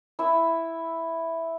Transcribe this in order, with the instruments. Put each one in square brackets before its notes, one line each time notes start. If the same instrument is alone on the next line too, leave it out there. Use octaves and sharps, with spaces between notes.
[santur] E4 E6